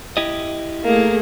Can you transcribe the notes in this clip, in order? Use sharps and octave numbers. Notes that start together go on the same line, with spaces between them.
E4 G4 D#5
A3 A#3 G#4